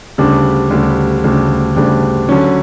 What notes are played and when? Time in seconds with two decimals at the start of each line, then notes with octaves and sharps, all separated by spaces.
0.18 D2 C#3 G3 D4
0.71 D2 C#3 G3 D4
1.24 D2 C#3 G3 D4
1.76 D2 C#3 G3 D4
2.29 D3 F#3 C#4